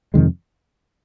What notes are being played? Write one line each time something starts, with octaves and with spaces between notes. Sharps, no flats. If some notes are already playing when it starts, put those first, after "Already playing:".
F2 C3 D#3 G#3